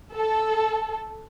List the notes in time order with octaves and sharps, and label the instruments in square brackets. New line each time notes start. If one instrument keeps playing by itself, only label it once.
[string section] A4